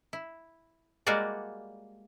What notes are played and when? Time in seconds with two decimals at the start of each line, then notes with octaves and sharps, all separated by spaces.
0.13 E4
1.07 G3 G#3 A#3 F4 F#4 D5